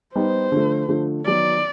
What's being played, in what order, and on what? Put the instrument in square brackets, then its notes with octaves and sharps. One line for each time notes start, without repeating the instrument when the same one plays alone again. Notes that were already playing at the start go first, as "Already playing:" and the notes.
[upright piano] G3 B3 D#4 G4 [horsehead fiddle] C5
[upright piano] D3 F3 A3
D3 F3 A3
[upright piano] D#3 F#3 B3 [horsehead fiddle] D5